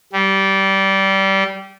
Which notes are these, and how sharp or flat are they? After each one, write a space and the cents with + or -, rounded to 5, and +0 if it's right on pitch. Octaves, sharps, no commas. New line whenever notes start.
G3 -20